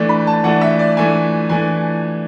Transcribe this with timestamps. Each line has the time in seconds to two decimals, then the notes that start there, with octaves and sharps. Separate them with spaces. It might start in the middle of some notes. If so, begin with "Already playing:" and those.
Already playing: E3 A3 D4
0.09 B5
0.27 A5
0.44 E3 A3 D4 F#5
0.61 E5
0.79 D5
0.97 E3 A3 D4 G#5
1.49 E3 A3 D4 G#5